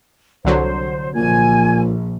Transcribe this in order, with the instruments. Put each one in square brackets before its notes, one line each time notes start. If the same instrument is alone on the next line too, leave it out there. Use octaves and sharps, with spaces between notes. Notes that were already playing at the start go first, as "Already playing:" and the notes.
[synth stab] C2 D3 F#3 [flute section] C5
[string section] A#1 [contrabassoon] A#2 [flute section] G#5 G#6